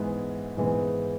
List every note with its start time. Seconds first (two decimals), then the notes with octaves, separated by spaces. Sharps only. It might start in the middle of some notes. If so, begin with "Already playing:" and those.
Already playing: G#2 E3 G#3 B3
0.57 G#2 E3 G#3 B3